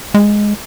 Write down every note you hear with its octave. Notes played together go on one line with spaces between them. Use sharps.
G#3